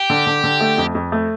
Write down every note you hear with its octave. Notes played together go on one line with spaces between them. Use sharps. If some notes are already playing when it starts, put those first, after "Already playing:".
Already playing: G4
D3
D3
D3
A3
F2
F2
A3